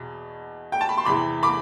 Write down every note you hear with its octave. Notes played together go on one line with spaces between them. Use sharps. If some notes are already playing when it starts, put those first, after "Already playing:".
Already playing: E2 B2
G5
A5
B5
C6
E2 C3 E3 B5 D6
B5 D6